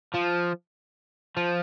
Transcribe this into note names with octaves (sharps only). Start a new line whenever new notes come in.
F3
F3